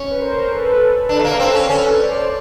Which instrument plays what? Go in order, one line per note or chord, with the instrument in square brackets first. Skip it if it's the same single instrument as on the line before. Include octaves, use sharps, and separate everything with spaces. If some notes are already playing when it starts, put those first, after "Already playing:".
Already playing: [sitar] C#4
[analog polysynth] B4
A#4 C5
A4 B4
[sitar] D4
A3
A#3
C4
C#4
[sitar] C#4 [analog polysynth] A4 B4
[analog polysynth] C5 D5